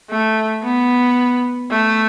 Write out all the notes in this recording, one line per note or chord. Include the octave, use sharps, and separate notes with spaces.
A3
B3
A3